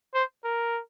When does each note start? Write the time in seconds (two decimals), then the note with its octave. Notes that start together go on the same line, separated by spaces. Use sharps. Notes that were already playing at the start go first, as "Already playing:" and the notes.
0.14 C5
0.44 A#4